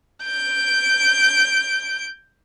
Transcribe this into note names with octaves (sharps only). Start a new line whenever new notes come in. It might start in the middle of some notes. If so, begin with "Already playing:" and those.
G6 D7